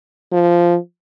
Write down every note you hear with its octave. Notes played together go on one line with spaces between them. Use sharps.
F3